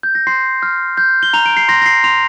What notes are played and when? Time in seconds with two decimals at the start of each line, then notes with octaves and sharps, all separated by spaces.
0.03 G6
0.15 A#6
0.27 C6 C7
0.63 F6
0.97 G6
1.23 G7
1.33 A#5 F7
1.46 D7
1.57 C7
1.68 C6 A#6
1.82 A#6
1.86 C7
2.04 C6 F7